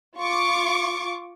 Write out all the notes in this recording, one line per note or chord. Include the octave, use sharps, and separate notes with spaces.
F4 C#6 D6